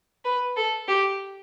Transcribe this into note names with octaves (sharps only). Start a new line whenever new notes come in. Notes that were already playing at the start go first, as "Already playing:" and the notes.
B4
A4
G4